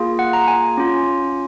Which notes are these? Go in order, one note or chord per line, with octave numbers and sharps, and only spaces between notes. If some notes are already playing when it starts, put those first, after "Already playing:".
Already playing: A#3 F4 G#4
F#5
A#5
G#5
C#4 F4